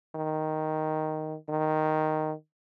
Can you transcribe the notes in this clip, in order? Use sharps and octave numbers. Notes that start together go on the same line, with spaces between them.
D#3
D#3